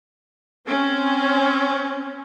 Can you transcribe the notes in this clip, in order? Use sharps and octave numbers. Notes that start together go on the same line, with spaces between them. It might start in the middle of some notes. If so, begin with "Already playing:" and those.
C4 C#4